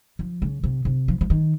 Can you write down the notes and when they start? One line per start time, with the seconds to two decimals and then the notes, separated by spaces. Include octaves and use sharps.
0.19 F3
0.42 C#3
0.64 C3
0.85 C3
1.08 F3
1.21 F3
1.30 D#3